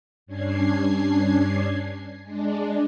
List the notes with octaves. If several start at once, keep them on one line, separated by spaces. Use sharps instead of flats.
G2 C#4 D4 G#6 C7
G#3 D4